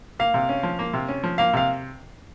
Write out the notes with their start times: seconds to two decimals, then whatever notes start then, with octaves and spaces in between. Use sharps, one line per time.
0.19 A#3 F5
0.34 C3
0.49 C#4
0.63 F3
0.79 A#3
0.94 C3
1.08 C#4
1.24 F3
1.38 A#3 F5
1.53 C3 F5